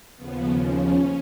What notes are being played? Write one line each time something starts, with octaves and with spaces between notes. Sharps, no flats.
D#2 C#3 F3 B3
C#4